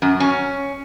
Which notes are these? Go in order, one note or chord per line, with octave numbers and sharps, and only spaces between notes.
F#2
C#4